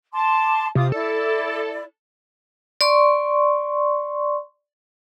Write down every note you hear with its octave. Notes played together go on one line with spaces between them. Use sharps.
A5 C6 D6
C3 F4 D6 D#6
E4 A4 D5
D5 C6 C#6